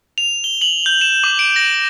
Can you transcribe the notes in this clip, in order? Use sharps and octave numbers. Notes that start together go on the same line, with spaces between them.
F7
G7
F#7
G6
E7
D6
D7
A#6